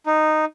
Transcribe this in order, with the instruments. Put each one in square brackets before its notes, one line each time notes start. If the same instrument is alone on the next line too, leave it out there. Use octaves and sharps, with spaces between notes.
[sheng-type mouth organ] D#4